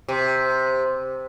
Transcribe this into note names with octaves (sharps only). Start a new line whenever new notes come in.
C3